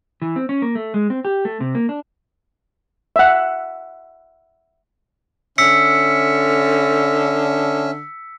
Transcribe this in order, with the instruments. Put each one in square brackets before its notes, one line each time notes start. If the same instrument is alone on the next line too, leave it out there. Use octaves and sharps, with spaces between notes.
[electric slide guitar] E3
C4
C#4
A#3
A3
G#3
C4
G4
A3
C3
A#3
D4
[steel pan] E5 F#5
[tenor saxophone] D3 [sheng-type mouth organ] C#4 E5 [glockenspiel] E6 B6 C#7